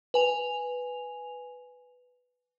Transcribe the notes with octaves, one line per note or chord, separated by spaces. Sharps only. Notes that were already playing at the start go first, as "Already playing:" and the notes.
B4 G#5 F7